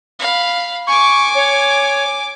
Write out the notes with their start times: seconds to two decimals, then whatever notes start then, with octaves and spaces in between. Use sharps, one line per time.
0.19 F5 B5
0.87 G#5 C#6 D6
1.35 C#5